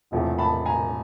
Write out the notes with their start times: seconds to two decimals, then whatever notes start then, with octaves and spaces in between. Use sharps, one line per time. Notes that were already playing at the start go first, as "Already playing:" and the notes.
0.11 E1 E2 C3 F3 A3
0.38 A5 B5
0.66 G#5 A#5